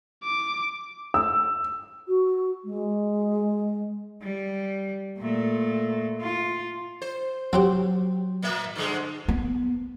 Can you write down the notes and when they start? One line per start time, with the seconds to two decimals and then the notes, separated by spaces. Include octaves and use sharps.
0.24 D6
1.14 E6
2.08 F#4
2.64 G#3
4.22 G3
5.19 A#2 A3
6.21 F4
7.02 C5
7.53 F#3 C4 F#4 G4
8.42 A#2 A#3 E5
8.75 G2 D3 G#3
9.28 B3